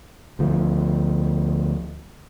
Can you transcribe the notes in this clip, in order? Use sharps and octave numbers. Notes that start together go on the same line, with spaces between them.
D2 F3